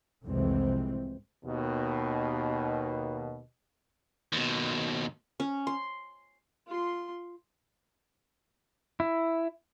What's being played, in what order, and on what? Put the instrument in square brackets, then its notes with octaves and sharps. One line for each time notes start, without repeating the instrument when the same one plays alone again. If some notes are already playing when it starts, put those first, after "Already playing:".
[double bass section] C2 F2 A2 E3 G#3 C4
[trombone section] D#2 B2
[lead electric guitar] D#2 B2
[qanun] C#4
C6
[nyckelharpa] F4 C6
[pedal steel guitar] E4